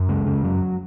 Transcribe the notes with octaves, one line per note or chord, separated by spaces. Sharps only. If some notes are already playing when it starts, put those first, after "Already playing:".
Already playing: F#2
C#3 G#3
C#3
F#2 F#3